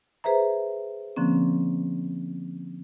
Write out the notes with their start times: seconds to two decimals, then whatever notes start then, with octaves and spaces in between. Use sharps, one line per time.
0.24 G#4 B4 C5 E5 A#5
1.16 D3 F3 A#3 C4 C#4